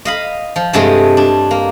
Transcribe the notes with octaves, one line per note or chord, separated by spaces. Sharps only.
D#5 F5 B5
F3
G2 C3 G#3 A3 D#5 C6
D4
A#3